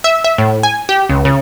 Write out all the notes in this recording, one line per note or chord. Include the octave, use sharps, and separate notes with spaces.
E5
E5
A2
G#5
G4
C#2
C#3